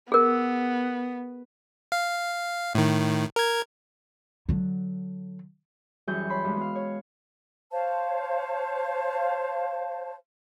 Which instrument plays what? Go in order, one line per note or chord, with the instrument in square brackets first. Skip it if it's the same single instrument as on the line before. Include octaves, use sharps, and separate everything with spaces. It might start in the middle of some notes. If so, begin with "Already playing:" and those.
[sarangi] B3 [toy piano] G#4 A#4
[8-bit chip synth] F5
A2 D#3
A#4 G#6
[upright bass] D3 F#3
[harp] F#2 E3 G3 G#4 C#6 G6
C#5 B5 C6
G2 G#3
B3 F5
C#5
[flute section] C5 C#5 F5 A5